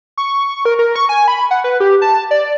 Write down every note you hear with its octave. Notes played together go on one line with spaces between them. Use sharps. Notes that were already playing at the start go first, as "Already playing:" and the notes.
C#6
A#4
A#4
C#6
G#5
B5
F#5
B4
G4
A5
D5